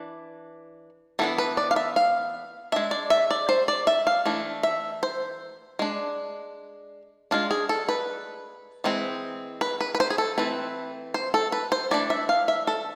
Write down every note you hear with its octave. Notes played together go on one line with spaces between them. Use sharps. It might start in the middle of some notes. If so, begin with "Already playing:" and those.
Already playing: E3 D4
E3 B3 D4 A4
B4
D5
F5
E5
F5
G#3 D4 E5
D5
E5
D5
C5
D5
E5
F5
E3 A3 D4
E5
C5
G#3 D4
G#3 D4 F4
G#4
A4
B4
E3 G#3 C4
B4
B4
B4
C5
G#4
A4
E3 A3 C4 B4
C5
A4
B4
C5
E3 A3 D4 D5
E5
F5
E5
A4